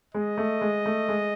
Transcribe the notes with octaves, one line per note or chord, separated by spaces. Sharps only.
G#3 D#5
A3
G#3
A3
G#3